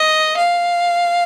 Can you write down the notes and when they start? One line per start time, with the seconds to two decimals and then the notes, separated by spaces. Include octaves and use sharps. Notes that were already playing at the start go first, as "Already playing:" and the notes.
Already playing: D#5
0.37 F5